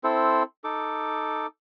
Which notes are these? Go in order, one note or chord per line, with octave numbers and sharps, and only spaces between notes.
C4 E4 A4 C5
D#4 A4 D6